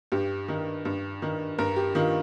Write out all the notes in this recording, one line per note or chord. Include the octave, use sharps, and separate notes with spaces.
G2 G4
D#3
G2
D#3
G2 A#4
G4
D#3 F4